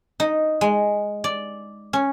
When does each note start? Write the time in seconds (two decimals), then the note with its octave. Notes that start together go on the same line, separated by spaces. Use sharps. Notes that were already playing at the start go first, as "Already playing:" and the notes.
0.20 D#4
0.61 G#3
1.24 D5
1.93 C#4